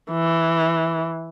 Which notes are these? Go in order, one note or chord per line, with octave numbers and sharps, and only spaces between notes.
E3